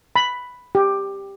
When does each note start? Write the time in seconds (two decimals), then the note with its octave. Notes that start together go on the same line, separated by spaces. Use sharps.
0.16 B5
0.75 G4